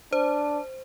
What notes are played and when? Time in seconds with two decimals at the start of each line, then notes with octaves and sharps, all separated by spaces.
0.13 D4 C5